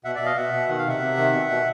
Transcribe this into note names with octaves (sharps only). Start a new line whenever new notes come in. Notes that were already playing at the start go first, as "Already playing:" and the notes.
B2 E5 F#5
B2 D5 E5
D#5 F5
B2 E5 F#5
B2
D#3 F#5
F5
C3 E5 F#5
C3
D#3
B2
B2